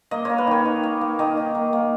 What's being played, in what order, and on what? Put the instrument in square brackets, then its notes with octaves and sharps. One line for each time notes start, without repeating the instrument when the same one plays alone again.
[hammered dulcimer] A#3 D#5
A#3 C#5
B4
D#3 C#5
D#3
A#3
A#3
D#3 D#5
D#3
A#3
A#3